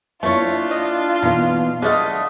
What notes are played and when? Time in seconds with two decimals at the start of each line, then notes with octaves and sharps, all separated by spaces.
0.23 A3 A#3 D4 E4 F4 C#5
0.71 D#5
1.23 B2 E3 A#3 D#4
1.82 D3 A3 G#4 D#5 F5 F#5